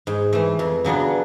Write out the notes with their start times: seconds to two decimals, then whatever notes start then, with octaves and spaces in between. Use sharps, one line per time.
0.07 G#2
0.33 E3 A3
0.59 F2
0.85 C#3 F#3 B3 D4